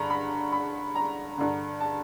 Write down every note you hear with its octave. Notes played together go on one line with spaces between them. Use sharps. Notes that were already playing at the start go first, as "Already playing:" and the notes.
Already playing: G2 D3 A#5 B5
B5
B5
A#5
G2 D3
A5